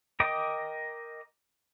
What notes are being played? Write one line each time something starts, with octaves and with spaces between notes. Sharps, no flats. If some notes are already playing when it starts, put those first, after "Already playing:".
A#4 D#5 G5 D6 D#6